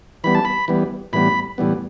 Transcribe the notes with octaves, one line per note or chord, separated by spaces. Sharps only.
E3 G3 B3 B5
A5
B5
E3 G3 B3
A2 E3 G3 B3 B5
A2 E3 G3 B3